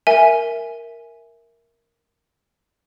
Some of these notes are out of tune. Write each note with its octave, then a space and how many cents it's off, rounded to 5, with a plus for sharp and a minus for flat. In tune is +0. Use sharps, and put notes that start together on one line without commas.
A#4 +0 E5 +0 G#5 +5